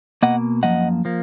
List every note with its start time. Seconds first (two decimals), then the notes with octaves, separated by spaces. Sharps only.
0.22 B2 A#3 D#5 F#5
0.63 F#2 F3 A#3 D#5 F#5
1.05 F3 A#3